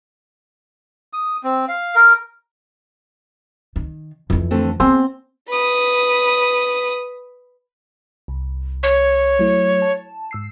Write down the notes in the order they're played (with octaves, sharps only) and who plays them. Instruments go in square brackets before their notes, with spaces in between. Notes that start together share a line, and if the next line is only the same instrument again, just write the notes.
[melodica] D#6
C4
F5
A#4
[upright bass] D#3
F2 E3
[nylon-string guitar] D3 A3 C4
[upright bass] B3 [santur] C4 [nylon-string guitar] G#4
[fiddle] B4 D#6
[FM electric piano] C2
[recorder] C#5
[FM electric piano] F#3 A3 E4
A5
G#2 E6 C7